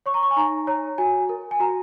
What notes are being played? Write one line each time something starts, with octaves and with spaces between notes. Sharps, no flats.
C#5 C#6
A#5
C#6
G#5
D#4 A#5
C#5 A#5
F#4 G#5
A#4
G#5
F#4 A#5